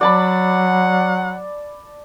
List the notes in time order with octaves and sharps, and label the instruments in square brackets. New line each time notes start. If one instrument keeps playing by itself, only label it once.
[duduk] F#3 [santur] D5 A5 B5 [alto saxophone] F#5